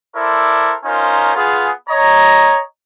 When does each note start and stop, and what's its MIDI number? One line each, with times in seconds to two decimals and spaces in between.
0.15 0.73 64
0.15 0.73 69
0.15 0.73 70
0.15 0.73 72
0.15 0.73 74
0.84 1.32 61
0.84 1.32 63
0.84 1.32 65
0.84 1.32 70
0.84 1.32 72
1.35 1.70 59
1.35 1.70 65
1.35 1.70 68
1.89 2.59 73
1.89 2.59 75
1.89 2.59 82